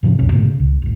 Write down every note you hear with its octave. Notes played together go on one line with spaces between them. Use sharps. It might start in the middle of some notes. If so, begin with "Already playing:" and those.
G#2 C3 F3 C#4
B1 F2 B2 C#4
G#2 B2 D3 A3
C#3
C#2
D#1 A1